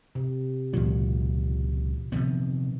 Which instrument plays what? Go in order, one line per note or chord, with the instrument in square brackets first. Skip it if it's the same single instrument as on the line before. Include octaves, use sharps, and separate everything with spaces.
[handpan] C3
[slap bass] C#2 F#3 [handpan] A#2 E3
[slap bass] C3 F3 B3 [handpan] D#3